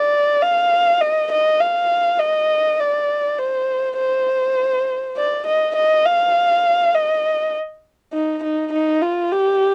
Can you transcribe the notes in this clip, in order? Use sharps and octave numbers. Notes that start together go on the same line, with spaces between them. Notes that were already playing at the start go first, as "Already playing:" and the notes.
Already playing: D5
F5
D#5
D#5
F5
D#5
D5
C5
C5
D5
D#5
D#5
F5
D#5
D#4
D#4
D#4
F4
G4